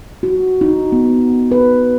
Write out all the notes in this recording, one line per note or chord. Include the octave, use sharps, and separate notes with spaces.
F#4
D#4
B3
B4